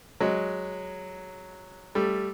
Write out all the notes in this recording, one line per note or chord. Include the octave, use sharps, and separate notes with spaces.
F#3 G#3
G3 A3